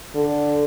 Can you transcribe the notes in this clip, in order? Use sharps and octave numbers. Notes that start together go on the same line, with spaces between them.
D3